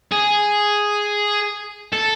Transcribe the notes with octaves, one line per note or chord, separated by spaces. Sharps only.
G#4
A4